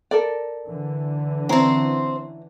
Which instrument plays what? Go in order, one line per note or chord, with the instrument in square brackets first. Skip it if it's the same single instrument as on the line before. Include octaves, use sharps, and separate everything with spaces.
[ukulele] A4 A#4 D5
[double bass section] D3 E3
[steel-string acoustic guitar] C4 C5 [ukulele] C#4 E4 A#5